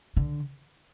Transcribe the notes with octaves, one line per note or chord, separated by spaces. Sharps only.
D3